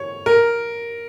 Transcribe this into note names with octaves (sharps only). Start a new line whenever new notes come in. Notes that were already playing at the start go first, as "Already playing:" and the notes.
Already playing: C#5
A#4